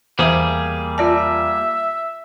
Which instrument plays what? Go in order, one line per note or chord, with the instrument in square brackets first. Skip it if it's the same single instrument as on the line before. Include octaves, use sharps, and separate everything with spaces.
[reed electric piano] E2 [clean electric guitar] G3 A#3 G#4 [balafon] C5 E5
[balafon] F4 D5 A5 [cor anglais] E5